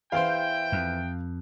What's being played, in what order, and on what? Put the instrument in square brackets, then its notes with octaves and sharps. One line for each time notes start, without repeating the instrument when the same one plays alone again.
[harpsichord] E2 C5 [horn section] E5 G5 [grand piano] F5 D7
[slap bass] F2